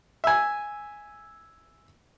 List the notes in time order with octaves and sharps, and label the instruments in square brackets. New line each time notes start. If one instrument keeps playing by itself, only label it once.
[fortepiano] E5 G#5